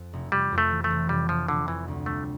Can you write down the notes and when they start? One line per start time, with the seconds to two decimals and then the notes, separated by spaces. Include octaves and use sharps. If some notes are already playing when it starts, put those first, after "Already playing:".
Already playing: F2
0.13 F1
0.32 F1 G3
0.52 F2
0.58 A3
0.71 E3
0.84 A3
0.90 F1
1.09 F1 G3
1.29 F1 F3
1.48 F1 D3
1.68 F1 E3
1.88 D2
2.06 G3 A3